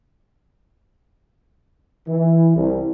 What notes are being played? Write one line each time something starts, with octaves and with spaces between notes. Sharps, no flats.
E3
C2